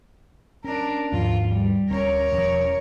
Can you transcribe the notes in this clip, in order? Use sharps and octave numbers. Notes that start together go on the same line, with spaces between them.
C#4 D4 A#4
D#2 G#2 F3 F4
G3
D1 C4 C#4 A#4 C#5
E1 F3 C#4